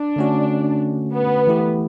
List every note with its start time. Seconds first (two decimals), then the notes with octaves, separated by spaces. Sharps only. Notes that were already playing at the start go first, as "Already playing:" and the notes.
Already playing: D4
0.16 D3 A3 C#4 F#4
1.14 B3
1.47 E3 A3 E4 G4